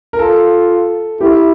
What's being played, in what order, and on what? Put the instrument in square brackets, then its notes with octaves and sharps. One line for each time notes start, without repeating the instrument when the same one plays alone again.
[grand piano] A#4
[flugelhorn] F4 [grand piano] A4
[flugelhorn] E4 [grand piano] G4